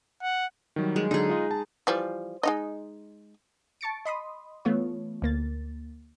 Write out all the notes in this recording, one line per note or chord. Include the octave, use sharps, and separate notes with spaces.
F#5
D#3 F#3 G3
G#3
D3 F#3 D#4 G#4
F4 D#5
A5
E3 F3 G3
G#3 D#4 D#5
A5 C#6 A6 C#7 D7
D#5 B5 C6 D#6
E3 A3 B3 F4 C#5
D2 A#3 A6